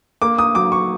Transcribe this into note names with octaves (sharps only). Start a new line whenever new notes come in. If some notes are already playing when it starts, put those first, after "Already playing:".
A#3 D6
D#6
F#3 D6
C#6